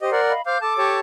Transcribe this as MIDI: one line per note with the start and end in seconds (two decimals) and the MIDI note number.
0.01 0.10 67
0.01 0.21 72
0.01 0.10 75
0.12 0.32 70
0.12 0.32 74
0.12 0.32 78
0.30 0.41 75
0.30 0.41 77
0.30 0.41 83
0.46 0.60 72
0.46 0.58 77
0.46 0.60 86
0.46 0.60 91
0.61 0.99 69
0.61 0.73 81
0.61 0.99 86
0.78 1.00 67
0.78 1.00 73
0.78 1.00 81